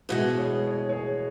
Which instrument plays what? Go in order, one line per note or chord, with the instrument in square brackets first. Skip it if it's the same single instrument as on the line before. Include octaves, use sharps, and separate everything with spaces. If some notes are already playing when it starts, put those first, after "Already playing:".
[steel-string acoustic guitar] E2 B2 G#3 [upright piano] F#4 B4
[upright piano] G#4 C#5
C#5
G#4 C#5